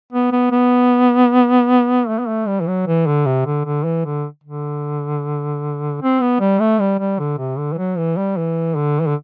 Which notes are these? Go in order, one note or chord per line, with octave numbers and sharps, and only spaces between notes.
B3
B3
B3
A3
B3
A3
G3
E3
F#3
E3
D3
C3
D3
D3
E3
D3
D3
C4
B3
G3
A3
G3
G3
D3
C3
D3
E3
F#3
E3
G3
E3
D3
E3
D3